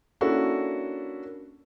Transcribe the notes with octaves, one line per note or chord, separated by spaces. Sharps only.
A#3 C#4 D4 E4 F#4 A4